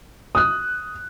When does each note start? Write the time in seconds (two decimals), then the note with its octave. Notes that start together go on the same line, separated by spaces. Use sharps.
0.35 D#6 F#6